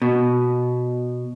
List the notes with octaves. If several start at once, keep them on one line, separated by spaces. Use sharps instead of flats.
B2